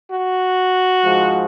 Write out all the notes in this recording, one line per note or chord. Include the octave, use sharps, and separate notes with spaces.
F#4
G#2 F3 G#3